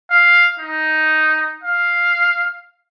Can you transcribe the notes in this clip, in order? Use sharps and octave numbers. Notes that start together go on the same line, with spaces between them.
F5
D#4
F5